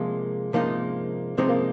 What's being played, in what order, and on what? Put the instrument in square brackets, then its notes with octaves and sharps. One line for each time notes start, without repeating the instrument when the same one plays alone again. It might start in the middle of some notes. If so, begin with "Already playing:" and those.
Already playing: [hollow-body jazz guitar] C3 F3 G#3 [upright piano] A#3
[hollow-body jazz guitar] C3 F3 G#3 D#4 [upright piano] A#3
[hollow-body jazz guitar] C3 F3 G#3 D#4 [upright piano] C4
[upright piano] A#3